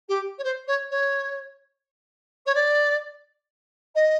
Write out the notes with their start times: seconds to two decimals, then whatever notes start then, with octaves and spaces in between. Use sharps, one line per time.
0.08 G4
0.38 C#5
0.43 C5
0.67 C#5
0.90 C#5
2.46 C#5
2.54 D5
3.95 D#5